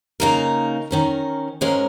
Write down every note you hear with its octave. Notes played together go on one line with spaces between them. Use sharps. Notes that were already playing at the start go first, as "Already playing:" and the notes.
C#3 A#3 D#4 A#4
D#3 C#4 A#4
G#2 G#3 C#4 A#4